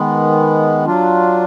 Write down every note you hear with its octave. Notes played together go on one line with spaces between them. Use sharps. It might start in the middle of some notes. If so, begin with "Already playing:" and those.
Already playing: D#3 G#3 B3
F#3 D4 F4